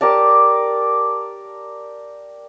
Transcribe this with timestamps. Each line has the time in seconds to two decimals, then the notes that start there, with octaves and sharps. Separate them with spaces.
0.01 G4 A#4 D5 A5